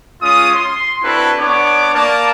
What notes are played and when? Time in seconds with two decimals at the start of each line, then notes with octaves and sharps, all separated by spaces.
0.22 G#3 C#4 F4 D#6
0.55 C6
1.03 C4 D4 E4 F#4 A4 B4
1.39 B3 D4 C#5 D6
1.93 A#3 D5 A5